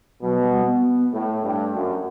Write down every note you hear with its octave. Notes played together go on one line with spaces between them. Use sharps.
B2 F#3
G3
B3
B3
A2 A3
G2
F#2